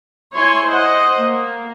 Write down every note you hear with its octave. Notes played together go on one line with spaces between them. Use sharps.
E4 C#5 G#5 C6
C5 D#5 F#5
A#3